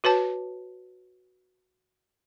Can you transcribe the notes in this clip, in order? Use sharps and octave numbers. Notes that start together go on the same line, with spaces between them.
F#4 B4 C#5 A5